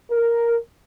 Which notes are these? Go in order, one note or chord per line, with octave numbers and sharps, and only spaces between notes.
A#4